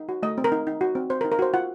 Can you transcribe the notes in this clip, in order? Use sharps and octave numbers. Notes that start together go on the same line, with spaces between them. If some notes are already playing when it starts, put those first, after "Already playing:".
Already playing: D#4
F#4
A3 D#5
C4
A#4
D#4
D#4
F#4
C4
C4 C5
A#4
D#4
A#4
F#4 C5
F4 F#5